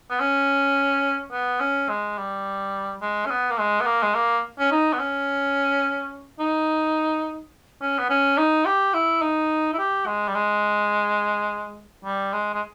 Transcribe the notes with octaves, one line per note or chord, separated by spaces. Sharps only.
B3
C#4
B3
C#4
G#3
G3
G#3
C#4
B3
A#3
G#3
B3
A#3
G#3
A#3
C#4
D#4
B3
C#4
D#4
C#4
B3
C#4
D#4
G4
E4
D#4
E4
G4
G#3
G3
G#3
G3
G#3
G#3